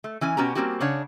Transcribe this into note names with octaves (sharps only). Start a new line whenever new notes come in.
A3
E3 C#4 G#5
B2 B3 C#4 F#4 G4 A#5
G3 A#3 C4 C#4 F#4 G4
C#3 D4 C#5 F#5